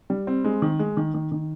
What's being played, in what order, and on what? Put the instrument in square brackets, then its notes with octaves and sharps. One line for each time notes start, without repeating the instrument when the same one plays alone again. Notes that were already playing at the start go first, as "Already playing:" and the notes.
[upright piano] G3
C4
G#3
D#3
G#3
D#3
D#3
D#3